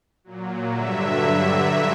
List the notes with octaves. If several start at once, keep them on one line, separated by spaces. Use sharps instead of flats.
A#2 F#3
G2 D3 F#3 E5